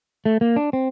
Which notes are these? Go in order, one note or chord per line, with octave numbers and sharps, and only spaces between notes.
A3
A#3
D4
C4